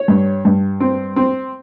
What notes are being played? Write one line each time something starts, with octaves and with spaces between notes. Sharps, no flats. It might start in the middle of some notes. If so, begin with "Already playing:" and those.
Already playing: C#5
G2
G2
C4
C4